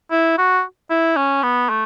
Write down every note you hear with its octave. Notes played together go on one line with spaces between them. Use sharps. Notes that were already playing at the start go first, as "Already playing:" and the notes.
E4
F#4
E4
C#4
B3
A3